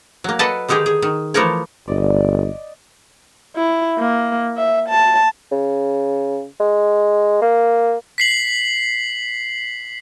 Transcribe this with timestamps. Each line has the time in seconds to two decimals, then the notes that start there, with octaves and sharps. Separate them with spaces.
0.24 F#3 A#3
0.39 A4 B4 D5 D#5 F#5 A5
0.68 D3 D#3 D#4 G4 G#4
0.86 G#4
1.02 D#3
1.34 E3 F3 A3 A#4 C#5
1.88 G1 D5 D#5
3.55 E4
3.98 A#3
4.57 E5
4.89 A5
5.52 C#3
6.60 G#3
7.41 A#3
8.18 B6 C7 F#7